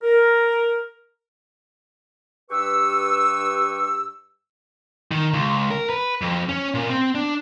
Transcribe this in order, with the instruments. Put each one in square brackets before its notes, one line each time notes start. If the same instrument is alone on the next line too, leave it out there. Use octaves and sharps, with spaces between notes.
[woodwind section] A#4
G2 G4 B4 C#6 E6
[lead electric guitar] D#3
C#2
A#4
B4
F2
C#4
A#2
C4
D4